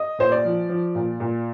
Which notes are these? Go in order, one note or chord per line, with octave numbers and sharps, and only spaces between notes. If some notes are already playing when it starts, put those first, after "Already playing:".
Already playing: D#5
A#2 C5
D5
F3
F3
A#2
A#2